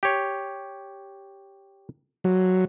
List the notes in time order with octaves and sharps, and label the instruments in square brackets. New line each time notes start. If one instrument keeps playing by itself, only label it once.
[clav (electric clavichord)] G4 C#5
[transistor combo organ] F#3